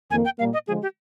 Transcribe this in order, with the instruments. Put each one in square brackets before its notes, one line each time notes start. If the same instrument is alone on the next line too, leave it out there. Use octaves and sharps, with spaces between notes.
[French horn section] F2 D#3 A#3 [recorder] G#5
[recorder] G5
[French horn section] A#2 G3 A#3 [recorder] F5
[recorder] D#5
[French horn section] D3 F3 G#3 [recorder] G#4
[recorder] G4